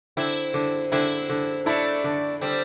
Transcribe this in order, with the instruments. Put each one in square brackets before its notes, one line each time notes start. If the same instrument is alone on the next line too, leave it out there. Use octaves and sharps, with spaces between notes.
[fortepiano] D3 [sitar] C4 E4
[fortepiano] D3
[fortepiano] D3 [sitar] C4 E4
[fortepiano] D3
[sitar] A3 D4 [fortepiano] E4
[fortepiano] D3
[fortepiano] D3 [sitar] G3 C4